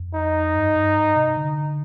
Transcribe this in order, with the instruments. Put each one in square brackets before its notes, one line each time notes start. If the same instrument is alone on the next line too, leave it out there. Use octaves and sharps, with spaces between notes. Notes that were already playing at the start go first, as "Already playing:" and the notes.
Already playing: [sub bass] F2
[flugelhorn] D#4
[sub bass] G2
G2
G#2
C3
D3